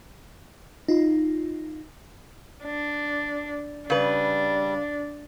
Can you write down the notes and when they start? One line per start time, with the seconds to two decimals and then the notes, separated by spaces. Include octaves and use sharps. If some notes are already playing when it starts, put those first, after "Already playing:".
0.88 D#4 F4
2.64 D4
3.90 C#3 G3 D4 B4